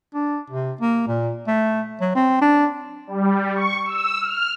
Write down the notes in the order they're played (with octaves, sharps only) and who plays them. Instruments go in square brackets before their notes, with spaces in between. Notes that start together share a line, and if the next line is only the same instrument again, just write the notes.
[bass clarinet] D4
C3
A#3
A#2
A3
F#3
C4
D4
[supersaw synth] G3
C#6
E6
F6